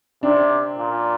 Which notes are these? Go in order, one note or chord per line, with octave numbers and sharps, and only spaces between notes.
C3 D4
A#2